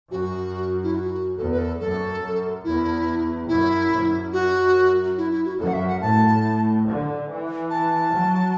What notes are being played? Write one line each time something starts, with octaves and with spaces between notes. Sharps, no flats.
F#2 F#4
E4
F#4
E2 A4
B4
A4
F#2 A4
F#2
E2 E4
F#2 E4
F#2
F#4
E4
E4
F#4
F#2 A4
F#5
E5
F#5
A2 A5
D3
E3
A5
F#3